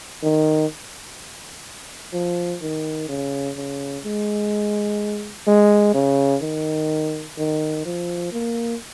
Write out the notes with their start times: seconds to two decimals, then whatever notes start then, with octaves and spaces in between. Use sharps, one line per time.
0.23 D#3
2.13 F3
2.61 D#3
3.09 C#3
3.57 C#3
4.05 G#3
5.47 G#3
5.94 C#3
6.42 D#3
7.38 D#3
7.85 F3
8.33 A#3